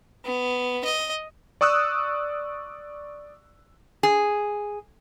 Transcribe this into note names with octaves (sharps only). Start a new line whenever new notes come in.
B3
D#5
D5 C#6 D#6 E6 F#6
G#4